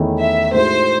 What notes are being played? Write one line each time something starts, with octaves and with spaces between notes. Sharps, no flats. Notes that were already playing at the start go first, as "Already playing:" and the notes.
Already playing: E2 D#3 A3 C#4 E4
E5
A2 G#3 D#4 F#4 C5